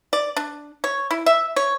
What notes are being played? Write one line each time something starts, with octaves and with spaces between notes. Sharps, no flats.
D5
D4
C#5
E4
E5
C#5